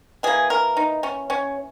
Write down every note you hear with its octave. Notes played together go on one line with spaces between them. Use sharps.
E3 A#3 G#4
A#4
D#4
C#4
C#4